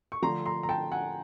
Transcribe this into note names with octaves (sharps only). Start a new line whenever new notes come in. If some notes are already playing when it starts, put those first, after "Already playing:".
C#6
D3 F3 A3 A#5 C6
A#5 C6
A#5
G5 A5
F#5 G#5